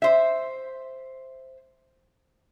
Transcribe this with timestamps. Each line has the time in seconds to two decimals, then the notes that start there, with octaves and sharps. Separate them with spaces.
0.02 C5 E5